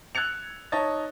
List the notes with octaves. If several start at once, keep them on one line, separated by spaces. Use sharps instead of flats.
E6 F#6 G#6 A6 C#7 F7
D#4 C#5 D#5 A5 A6